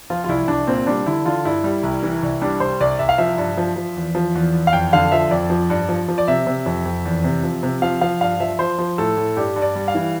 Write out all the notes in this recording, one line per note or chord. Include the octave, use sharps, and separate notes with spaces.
F3 F4
F4
C2 E4
C2 D4
A#2 C4
G3 D4
D3 E4
D3 F4
G2 E4
G3
C2
E3
C2
G3 D4
C2 C5
C2 D5
C2 E5
F5
F3 E5
G2
F3
F3
E2
F3
E2
E2
F5
F2 G5
D3 F5
F3 E5
F2 D5
F3
G2
F3
F3
D5
C3 E5
C3
F2
F2
E2
C3
F3
C3
F3 F5
F3 F5
G2 F5
F3 E5
F3 C5
F3
A2 A4
A2
G2 G4
G2
D5
G3
F5
E3